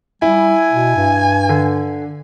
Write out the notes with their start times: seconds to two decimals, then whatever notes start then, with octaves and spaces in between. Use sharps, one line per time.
0.22 G3 E4 G#5
0.72 B2
0.96 G2
1.49 D3